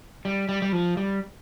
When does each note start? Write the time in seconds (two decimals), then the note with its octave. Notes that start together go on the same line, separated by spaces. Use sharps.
0.25 G3
0.49 G3
0.62 G3
0.72 F3
0.97 G3